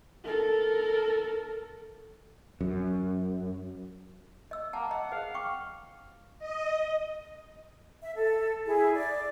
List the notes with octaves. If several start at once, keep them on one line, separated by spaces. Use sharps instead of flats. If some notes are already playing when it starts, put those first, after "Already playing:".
A4 A#4
F#2
D#5 E6
A#3 F#5 A5
D#5 F#5 A#5
G#4 C5 D#5 F5
G5 C#6 D6
D#5
E5
A4
E4 G#4
D5